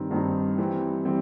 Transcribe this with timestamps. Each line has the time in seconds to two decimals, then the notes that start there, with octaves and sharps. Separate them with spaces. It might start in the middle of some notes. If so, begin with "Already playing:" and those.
Already playing: G2 D#3 G3 C4 D#4
0.11 G2 D#3 G3 C4 D#4
0.58 E3 G3 C4
1.05 E3 G3 C4